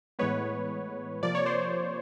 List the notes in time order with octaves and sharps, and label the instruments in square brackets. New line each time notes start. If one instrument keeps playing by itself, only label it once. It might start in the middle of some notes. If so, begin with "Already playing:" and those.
[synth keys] A2 E3 G#3 B3 B4 C#5
C3 F3 A#3 D5
C#5
C5 D5